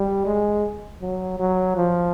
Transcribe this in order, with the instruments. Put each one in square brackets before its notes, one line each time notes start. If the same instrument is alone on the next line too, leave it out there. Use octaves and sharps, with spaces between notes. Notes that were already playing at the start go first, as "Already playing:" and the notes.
Already playing: [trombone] G3
G#3
F#3
F#3
F3